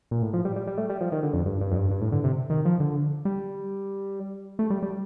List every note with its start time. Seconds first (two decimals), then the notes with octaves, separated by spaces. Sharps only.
0.11 A#2
0.22 A2
0.33 F3
0.45 G3
0.56 G3
0.67 G3
0.78 A3
0.90 G3
1.01 F3
1.12 D#3
1.23 D3
1.34 F2
1.46 G2
1.61 G2
1.71 F2
1.76 G2
1.91 G2
2.01 A2
2.12 D3
2.24 C3
2.50 D#3
2.65 F3
2.80 D3
3.25 G3
4.59 A3
4.70 G3
4.83 G3